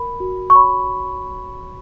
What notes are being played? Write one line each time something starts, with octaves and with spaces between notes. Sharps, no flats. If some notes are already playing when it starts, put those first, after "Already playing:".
Already playing: A#4 B5
F#4
C#6
C#5 B5